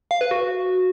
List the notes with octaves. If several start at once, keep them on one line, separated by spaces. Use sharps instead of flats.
F5
B4
F#4